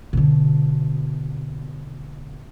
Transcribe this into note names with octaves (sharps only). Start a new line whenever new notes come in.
B2 D3